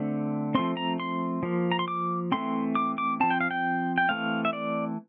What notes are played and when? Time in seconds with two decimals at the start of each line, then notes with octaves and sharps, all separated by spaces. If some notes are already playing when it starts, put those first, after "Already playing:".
Already playing: D3 A3 C4
0.55 F3 A3 C4 C6
0.77 A#5
1.00 C6
1.43 F3 A#3
1.72 A#5
1.79 C6
1.88 D6
2.32 E3 A3 C4 C6
2.75 D6
2.98 D6
3.20 F3 C4 A5
3.30 G5
3.41 F5
3.51 G5
3.98 G5
4.09 E3 A3 C4 F5
4.45 E5
4.53 D5